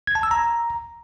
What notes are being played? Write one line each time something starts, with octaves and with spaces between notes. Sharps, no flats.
G#6
A5
E6
A#5